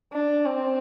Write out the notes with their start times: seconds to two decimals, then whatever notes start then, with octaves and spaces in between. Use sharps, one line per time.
0.12 D4
0.45 C4